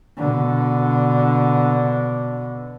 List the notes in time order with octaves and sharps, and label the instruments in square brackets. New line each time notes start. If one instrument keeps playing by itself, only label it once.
[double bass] B2 D3